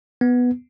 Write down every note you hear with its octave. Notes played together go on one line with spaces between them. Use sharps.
B3